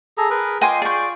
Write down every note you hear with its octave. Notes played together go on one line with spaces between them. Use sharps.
G#4 A4 A#5
G#4 A#4 B4
F4 D#5 G5 G#5 C6 D6
G#4 D5 C#6 G6